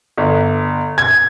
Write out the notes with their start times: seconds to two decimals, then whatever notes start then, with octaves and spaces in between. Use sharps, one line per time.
0.18 G1
0.98 G#6